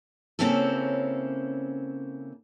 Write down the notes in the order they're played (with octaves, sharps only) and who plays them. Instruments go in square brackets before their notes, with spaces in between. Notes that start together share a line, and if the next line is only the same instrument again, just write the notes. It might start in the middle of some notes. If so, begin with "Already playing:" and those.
[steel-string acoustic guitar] C#3 A#3 C4 C#4 E4 A4